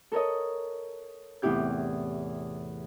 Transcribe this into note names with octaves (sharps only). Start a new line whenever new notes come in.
A4 A#4 C#5 D#5
E2 A2 C3 E4 G4 G6